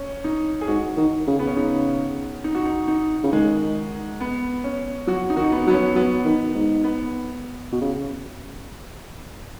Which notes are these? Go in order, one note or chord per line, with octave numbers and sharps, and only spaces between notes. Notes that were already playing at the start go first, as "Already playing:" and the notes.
Already playing: C#4
D#4
G#4
G#2 F#4
D#3
C#3
B3
C#4
C#3 D#4
D#4
F#4
D#4
D#4
C#3
D#3 G#3
B3
C#4
F#3 F#4
D#4
D#3 F#4
D#4
B3
F#3 B3
C#4
F#3 B3
D#3
G#2
B3
B2
C#3